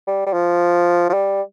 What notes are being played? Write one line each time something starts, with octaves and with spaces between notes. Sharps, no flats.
G3
G3
F3
F3
G3